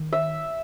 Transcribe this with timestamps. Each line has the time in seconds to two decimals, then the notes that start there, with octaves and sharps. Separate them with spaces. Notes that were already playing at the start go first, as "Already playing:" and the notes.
Already playing: D#3
0.13 E5